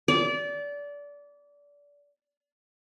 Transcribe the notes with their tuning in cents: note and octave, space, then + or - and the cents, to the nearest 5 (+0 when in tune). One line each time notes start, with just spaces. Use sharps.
D5 -25